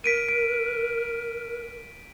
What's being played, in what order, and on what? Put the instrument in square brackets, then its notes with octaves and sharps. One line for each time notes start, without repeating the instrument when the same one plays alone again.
[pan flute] A#4 [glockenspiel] B6 D7 D#7
[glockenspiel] D7